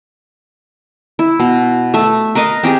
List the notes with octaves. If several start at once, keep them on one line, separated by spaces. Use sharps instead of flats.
E4
B2
A3 E5
A#4 B4 D#5 F5
C4 G4 G#4